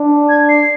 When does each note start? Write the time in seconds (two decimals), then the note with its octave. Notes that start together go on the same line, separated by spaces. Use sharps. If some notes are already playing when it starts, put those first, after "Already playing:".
Already playing: D4
0.29 G#6
0.49 C7